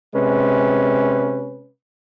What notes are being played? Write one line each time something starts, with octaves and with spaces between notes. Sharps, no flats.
C3 G#3 C#4 B4